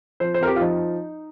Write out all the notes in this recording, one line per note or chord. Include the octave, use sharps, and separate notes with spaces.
F3 C5
C5
F2 A#4
G4
F4
F3 D#4